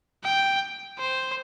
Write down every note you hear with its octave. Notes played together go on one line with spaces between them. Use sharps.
G5
C5